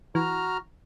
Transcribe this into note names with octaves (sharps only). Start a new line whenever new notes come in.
E3 F#4 A#5 F6